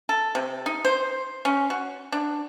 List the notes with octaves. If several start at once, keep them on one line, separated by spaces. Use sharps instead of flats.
A4
C3
D#4
C5
C#4
F#4
D4